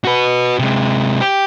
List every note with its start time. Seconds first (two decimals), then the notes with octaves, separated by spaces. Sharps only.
0.04 F#4 B4
0.59 C3 G#3
1.21 G4